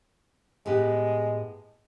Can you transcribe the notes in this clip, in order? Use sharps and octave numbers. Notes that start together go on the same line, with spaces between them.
A2 G#3 B3 G4